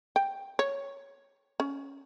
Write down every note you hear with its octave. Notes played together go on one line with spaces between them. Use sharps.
G5
C#5
C#4